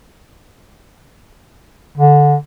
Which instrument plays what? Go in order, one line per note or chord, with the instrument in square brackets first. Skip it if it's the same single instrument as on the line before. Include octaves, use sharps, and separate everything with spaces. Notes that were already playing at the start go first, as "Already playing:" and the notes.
[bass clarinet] D3